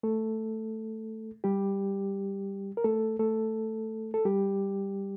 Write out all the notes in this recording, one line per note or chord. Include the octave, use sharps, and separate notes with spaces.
A3 A4
G3 G4
A#4
A3 A4
A3 A4
A4
G3 G4